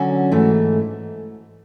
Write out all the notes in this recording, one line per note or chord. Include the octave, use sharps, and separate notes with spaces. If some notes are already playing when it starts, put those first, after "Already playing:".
Already playing: D3 F#3 C#4 F#4
G#2 E3 A3